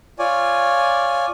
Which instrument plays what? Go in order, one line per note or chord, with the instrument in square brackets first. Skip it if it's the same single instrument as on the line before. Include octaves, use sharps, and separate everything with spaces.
[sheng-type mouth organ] F4 C#5 D5 G#5